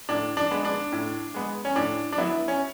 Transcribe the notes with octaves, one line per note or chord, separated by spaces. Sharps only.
A2 D4
D4
G#3 B3
D4
A2
G#3 B3
C#4
A2 D4
D4
F#3 B3 E4
C#4